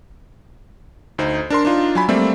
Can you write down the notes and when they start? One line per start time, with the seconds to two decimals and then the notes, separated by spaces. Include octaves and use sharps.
1.18 D2 D#4 C5
1.50 D4 A#4 C6
1.65 D4 D#4 F4
1.95 F#3 G#5 B5
2.08 G3 A3 A#3 C4 D5 E5